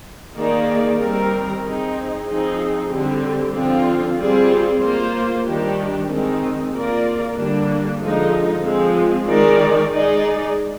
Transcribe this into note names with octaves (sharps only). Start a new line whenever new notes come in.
D#3 A#3 D#4 G#4 D5
D#3 G3 C4 G4 A#4
C4 D#4 G#4
F3 C4 D#4 G#4
D3 G3 C4 G4
D3 F3 C4 F4
G3 C4 F4 G#4 D5
A#3 F4 C5
D#3 G3 D4 G4
D#3 G#3 C4 D#4
A#3 F4 A#4 D5
D3 G3 A#3 D4
D3 F3 G#3 D#4
F3 G#3 C4
D#3 G#3 D#4 A#4 D5
G#3 D#4 G#4 D5